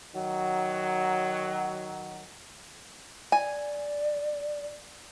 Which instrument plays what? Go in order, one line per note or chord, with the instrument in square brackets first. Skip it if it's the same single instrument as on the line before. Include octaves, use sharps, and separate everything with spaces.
[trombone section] D#3 F#3
[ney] D5 [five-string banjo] G#5